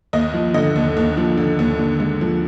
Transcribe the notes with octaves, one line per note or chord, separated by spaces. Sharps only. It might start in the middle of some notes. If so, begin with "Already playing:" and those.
D#2 D#5
F3
D3 D#5
D#2
D#2
F3
D3
D#2
D3
G#3
F3